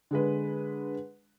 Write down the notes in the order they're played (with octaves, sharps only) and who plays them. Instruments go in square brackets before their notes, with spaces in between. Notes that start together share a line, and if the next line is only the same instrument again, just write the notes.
[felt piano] D3 G#3 B4